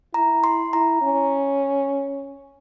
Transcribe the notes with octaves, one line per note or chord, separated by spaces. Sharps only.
E4 A#5
C6
E4 A#5
C#4